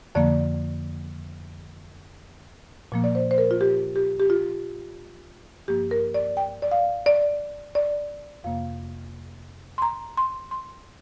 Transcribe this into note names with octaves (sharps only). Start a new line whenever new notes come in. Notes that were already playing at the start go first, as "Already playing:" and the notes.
F2 D3 F3 A#3 D5
A#2 F3 A#3
D5
C5
C5
A#4
F4
G4
G4
G4
F4
G2 F3 A#3 G4
A#4
D5
G5
D5
F5
D5
D5
F2 C3 A#3 F5
C6
A#5
C6
C6